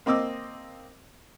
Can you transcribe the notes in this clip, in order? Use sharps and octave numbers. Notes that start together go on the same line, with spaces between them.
A#3 C4 D#5 D6 E6